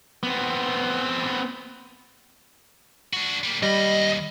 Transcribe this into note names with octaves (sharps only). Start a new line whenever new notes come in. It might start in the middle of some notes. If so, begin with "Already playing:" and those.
B3 C4
D4 F#4
G3 A#3
D#2 G3 D#5 B5